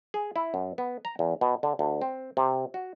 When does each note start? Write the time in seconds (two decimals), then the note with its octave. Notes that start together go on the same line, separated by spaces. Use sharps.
0.14 G#4
0.36 E4
0.54 F#2
0.78 B3
1.05 A#5
1.19 E2
1.41 B2
1.63 D3
1.79 D2
2.02 C4
2.37 C3
2.74 F#4